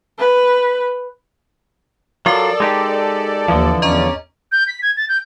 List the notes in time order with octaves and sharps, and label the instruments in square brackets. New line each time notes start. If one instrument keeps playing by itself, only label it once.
[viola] B4
[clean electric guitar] F#3 F4 [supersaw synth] A4 D5 [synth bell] A#4 D6
[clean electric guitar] G#3 D#4 G4
[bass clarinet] D#2 [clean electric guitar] D3 E3 F3
[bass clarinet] E2 [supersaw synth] C#4 D5 [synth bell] D#5 A#5 C#6
[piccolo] G6
B6
G#6
A6
G6